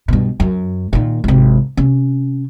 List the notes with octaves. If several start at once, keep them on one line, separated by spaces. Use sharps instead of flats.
G2 B2
F#2
A#2 D#3
G#1 C3
C3 C#4